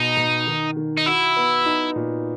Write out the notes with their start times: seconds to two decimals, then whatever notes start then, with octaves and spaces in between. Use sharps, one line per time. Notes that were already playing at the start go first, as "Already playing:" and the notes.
Already playing: B2 D#4
0.17 B2
0.47 D#3
0.77 D#3
0.97 D#4
1.06 E4 F#4
1.36 B3
1.66 D#4
1.96 A#2